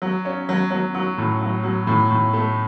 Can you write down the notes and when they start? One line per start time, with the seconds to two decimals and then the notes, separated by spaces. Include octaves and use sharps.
0.02 F#3
0.25 C#4
0.49 F#3
0.71 F#3
0.95 F#3
1.18 A2
1.41 F#3
1.63 F#3
1.87 A2
2.11 A2
2.33 A3